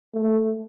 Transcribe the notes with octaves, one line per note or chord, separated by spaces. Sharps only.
A3